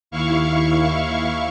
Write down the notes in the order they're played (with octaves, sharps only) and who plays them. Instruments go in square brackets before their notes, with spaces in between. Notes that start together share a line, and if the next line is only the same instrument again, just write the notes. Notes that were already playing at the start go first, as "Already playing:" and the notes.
[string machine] D#2 E4 F5 C#6